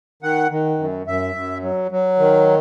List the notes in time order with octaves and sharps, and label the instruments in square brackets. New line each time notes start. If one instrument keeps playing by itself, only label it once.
[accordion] D#3 F#5
D#3
F#2
F#2 E5
F#2
F#3
F#3
D#3